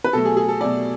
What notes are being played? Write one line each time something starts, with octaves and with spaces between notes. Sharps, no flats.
B4
B2 F#3 A3 A4
G#4
G#4
A4
B2 F#3 A3 D5